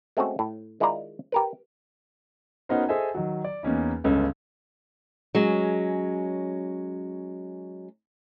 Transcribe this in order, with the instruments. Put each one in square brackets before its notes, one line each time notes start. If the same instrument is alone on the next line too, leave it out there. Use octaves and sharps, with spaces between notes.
[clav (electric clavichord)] G#3 A3 C4 C#4 F#4
A2
D#3 G#3 E4 F4 D5 A#5
G4 A#4 B4
[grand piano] B3 C#4 D#4 F#4 A#4 C5
G#4 A4 C5 D#5 E5 G#5
D#3 F#3
D5
E2 A#3 C#4 D#4
G1 C#2 C#4 A4
[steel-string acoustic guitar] F#3 G#3 C#4